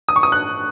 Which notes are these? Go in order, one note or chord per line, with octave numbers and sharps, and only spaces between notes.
D#6
C#6
D#6
F#6